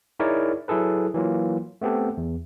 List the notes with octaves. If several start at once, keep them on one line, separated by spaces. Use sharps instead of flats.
D#4 E4 G#4 A#4 C#5 D5
F#3 E4 G#4 A4 B4
E3 F#3 A#3 F4
A3 B3 C4 G4 A4
E2